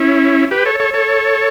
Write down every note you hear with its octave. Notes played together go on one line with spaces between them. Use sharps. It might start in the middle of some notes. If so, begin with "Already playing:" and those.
Already playing: C#4 E4
G4 B4
A4 C#5
A4 C#5
A4 C#5